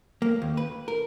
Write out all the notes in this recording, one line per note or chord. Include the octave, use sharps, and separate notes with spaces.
A#3
D#2
B4
A#4